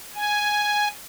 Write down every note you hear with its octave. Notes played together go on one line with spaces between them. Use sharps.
G#5